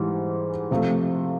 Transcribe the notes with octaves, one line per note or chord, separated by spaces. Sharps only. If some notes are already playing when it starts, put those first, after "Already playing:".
Already playing: G#2 E3 G3
C3 F3 A3